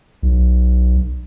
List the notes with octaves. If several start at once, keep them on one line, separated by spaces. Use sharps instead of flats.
B1